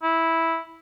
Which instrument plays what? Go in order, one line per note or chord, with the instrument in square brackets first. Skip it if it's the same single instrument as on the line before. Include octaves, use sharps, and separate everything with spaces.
[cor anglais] E4